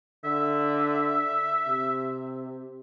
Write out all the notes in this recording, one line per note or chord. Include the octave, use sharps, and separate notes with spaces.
D3 E5
C3